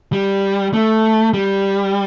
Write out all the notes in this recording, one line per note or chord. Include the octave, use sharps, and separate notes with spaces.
G3
A3
G3